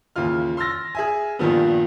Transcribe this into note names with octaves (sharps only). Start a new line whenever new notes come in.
D#2 C#3 E3 F4 F6
C6 E6 F6 A6 A#6
G#4 E5 G#5
G2 A#2 D#3 F3 B3